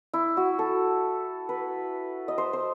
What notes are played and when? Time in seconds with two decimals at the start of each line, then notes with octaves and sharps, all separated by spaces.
0.14 E4
0.37 F#4
0.59 A4
1.49 B4
2.28 D#5
2.38 C5
2.53 C5